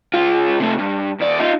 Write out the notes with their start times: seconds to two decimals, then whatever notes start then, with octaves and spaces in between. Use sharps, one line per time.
0.14 C#2 F4
0.60 C3 A3
0.79 G2
1.21 D#2 D5
1.40 D#4 F4